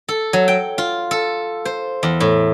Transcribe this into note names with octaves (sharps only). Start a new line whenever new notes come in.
A4
F#3
G5
F4
A4
C5
E2
A2